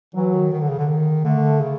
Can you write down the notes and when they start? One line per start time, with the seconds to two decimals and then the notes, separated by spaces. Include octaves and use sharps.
0.15 E3 F#3
0.33 D#3
0.52 D#3
0.61 D3
0.69 C#3
0.79 D3
0.88 D#3
1.24 D3 A3
1.60 C#3